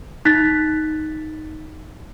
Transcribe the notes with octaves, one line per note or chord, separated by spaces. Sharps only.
D#4 F#6 A6 B6